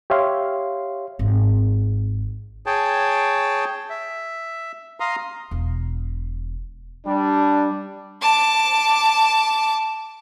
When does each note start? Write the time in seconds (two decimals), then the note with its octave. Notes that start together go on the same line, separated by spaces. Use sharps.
0.10 G4 C#5 E5 F5 C6
1.19 G#1
2.66 G#4 C#5 G5 A5
3.90 E5
5.00 F5 A#5 C6 D#6
5.51 E1
7.06 G3 D4
8.22 A5 D6